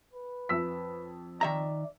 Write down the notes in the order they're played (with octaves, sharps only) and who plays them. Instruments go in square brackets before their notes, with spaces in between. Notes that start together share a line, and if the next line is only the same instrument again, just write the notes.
[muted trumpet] B4
[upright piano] F2 E6 B6
[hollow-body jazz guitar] D#3 E5 A#5 [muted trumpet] D5